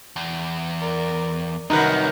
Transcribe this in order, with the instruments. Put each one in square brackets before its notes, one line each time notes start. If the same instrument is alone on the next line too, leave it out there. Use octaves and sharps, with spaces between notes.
[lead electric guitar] E2
[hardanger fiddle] A#4 D5
[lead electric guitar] C2 [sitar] F#2 D#3 B4 [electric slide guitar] D#4 [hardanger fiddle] A#4 F#5